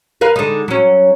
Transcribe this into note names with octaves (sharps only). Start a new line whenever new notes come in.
A#4 B4 F5
D3 G#3 D#4
F#3 C#4